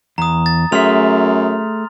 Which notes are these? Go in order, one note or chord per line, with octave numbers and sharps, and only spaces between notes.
E2 A#5 D#6
A6
F#2 A3 G#4 E5 C6 F6 F7